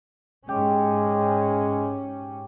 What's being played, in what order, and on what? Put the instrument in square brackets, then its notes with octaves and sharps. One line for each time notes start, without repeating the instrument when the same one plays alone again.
[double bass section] G#2 C#4 [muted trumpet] G#3 [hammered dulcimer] G4